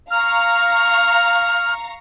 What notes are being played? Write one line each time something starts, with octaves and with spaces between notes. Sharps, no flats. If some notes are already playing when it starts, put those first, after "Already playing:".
F5 A#5 C#6 F6